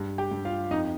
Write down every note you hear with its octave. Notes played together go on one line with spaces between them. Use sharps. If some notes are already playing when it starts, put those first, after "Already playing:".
Already playing: G2 G#3
G4 G5
G2
F4 F5
F2 D#4 D#5